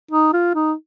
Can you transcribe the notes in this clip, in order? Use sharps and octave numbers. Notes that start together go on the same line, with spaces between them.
D#4
F4
D#4